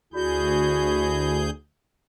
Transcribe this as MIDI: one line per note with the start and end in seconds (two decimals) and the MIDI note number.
0.14 1.50 38
0.14 1.50 62
0.14 1.50 64
0.14 1.50 66
0.14 1.50 68
0.14 1.50 91